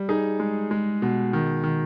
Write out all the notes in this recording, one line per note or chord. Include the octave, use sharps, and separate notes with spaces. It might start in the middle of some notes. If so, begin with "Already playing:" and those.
Already playing: G3
D#4 G#4
G#3
G#3
B2
D#3
D#3